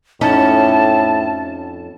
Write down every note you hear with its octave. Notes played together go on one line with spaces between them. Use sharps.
F2 A2 C#4 D#4 A5